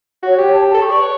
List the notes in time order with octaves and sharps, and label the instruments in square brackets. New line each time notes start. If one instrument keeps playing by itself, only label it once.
[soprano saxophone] F#4 [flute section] C#5
[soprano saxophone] G4 [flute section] C#5
[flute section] A5
A5
[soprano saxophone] A4
[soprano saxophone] G4 [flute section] C#6
[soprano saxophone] D5
[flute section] B4 [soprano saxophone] C#5